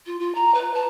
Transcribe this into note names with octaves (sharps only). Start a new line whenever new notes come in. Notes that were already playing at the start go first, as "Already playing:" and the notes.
F4
F4
A#5
B4
A5